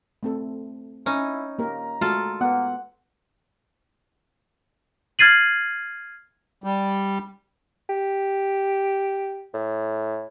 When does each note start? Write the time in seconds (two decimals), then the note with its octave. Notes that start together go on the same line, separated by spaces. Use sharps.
0.23 A3 C4 A4
1.06 C#4 D#4 E4
1.59 A#3 G4 A#4 A#5
2.01 G#3 A3 F4 F#4 A4
2.41 A#3 B3 F#5
5.19 F6 G#6 A6 C7 D#7 F#7
6.64 G3
7.90 G4
9.54 A2